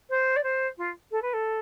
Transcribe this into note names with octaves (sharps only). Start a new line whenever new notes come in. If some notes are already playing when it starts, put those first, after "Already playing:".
C5
D5
C5
F4
A4
B4
A4